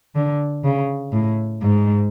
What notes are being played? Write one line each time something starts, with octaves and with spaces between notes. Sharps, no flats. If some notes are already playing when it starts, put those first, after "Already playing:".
D3
C#3
A2
G#2